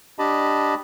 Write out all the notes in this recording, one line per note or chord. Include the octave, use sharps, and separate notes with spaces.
D4 G4 D#5 A5 B5